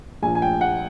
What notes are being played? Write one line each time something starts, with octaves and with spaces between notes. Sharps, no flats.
A#1 A#2 G#5
G#5
G5
F#5